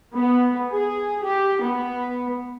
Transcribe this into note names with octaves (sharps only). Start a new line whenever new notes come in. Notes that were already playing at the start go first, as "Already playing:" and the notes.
B3
G#4
G4
B3